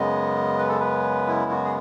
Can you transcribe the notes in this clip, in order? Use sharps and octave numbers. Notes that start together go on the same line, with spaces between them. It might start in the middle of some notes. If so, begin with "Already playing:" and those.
Already playing: F#2 C#3 G#3 B3 D#5
B4
A4
B4
E4
F#4
G#4